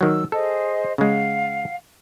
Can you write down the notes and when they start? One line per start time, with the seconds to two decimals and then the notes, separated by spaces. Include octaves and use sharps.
0.01 D#3 F#3 E6
0.32 G#4 A4 C5 D#5
0.98 C#3 G#3 F5 F#5